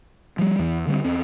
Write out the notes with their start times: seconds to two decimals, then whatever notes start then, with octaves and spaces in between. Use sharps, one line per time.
0.38 F3 G3
0.59 E2 E3
0.87 D3 G3 G#3 C4
1.05 E2 C4